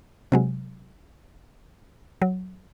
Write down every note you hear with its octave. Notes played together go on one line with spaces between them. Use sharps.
C3 F#3 G#3
F#3